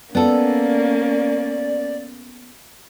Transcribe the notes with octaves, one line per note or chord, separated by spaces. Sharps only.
A#3 B3 C#4 A4 D5